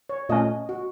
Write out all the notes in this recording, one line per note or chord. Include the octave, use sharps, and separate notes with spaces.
C#5
A#2 A3 C#4 D#5
F#4